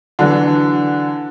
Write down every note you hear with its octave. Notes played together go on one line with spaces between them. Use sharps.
D3 E3 F#3 D4